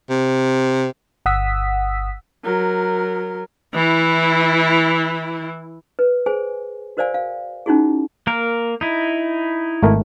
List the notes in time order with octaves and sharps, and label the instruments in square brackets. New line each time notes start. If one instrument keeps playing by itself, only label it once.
[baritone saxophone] C3
[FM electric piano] G1 F#5 D#6 E6 B6
[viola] F#3 A#4
E3 E4
[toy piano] B4
G#4 C5 G#5
F#4 A#4 C5 D5 F5 G#5
F5
C#4 D#4 E4 F#4 G#4
[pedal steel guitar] A#3 A#4
D#4 E4
[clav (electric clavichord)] G#1 A3 A#4